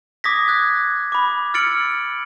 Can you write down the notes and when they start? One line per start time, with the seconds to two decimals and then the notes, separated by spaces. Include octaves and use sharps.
0.24 D6 D#6 G#6 A#6 B6
0.47 D#6 F#6 G#6 B6
1.12 B5 D6
1.54 E6 F6 A6 C#7 D7 F#7